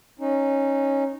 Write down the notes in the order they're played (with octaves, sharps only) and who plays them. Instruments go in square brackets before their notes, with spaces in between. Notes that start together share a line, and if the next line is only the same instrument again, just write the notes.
[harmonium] C#4 D#4